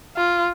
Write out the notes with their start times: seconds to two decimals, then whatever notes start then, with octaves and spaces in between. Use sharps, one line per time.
0.16 F4